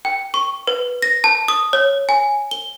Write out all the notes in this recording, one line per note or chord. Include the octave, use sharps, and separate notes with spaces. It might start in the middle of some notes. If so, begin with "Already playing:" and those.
G5
C#6
B4
A#6
A5
D#6
C#5
G#5
G7